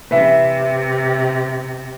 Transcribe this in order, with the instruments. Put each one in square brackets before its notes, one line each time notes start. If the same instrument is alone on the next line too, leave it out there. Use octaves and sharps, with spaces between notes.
[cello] C3 [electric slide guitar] B4 E5